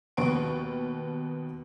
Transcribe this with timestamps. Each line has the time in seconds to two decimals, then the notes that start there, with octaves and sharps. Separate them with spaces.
0.17 D#2 B2 B3 C#6 D7